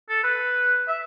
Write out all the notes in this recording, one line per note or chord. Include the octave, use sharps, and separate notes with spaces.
A4
B4
E5